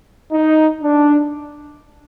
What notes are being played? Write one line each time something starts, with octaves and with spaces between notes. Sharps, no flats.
D#4
D4